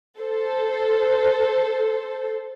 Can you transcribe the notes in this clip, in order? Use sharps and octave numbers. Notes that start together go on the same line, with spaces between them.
A4 C5